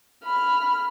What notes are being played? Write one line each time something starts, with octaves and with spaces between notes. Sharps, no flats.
B5 F6